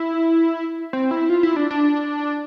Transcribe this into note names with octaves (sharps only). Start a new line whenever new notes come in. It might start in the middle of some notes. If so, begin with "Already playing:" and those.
Already playing: E4
C4
E4
F4
E4
D4
D4